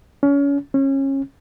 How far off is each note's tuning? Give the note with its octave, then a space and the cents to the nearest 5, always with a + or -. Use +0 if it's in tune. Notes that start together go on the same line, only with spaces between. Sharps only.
C#4 +30
C#4 -25